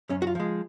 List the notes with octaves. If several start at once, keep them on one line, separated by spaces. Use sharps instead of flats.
F#2 C#4
F#4
F4
F3 G#3